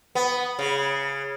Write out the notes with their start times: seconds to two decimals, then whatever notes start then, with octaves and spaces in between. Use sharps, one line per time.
0.15 B3
0.59 C#3